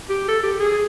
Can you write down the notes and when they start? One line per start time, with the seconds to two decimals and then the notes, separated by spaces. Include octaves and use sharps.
0.10 G4
0.28 A4
0.43 G4
0.60 G#4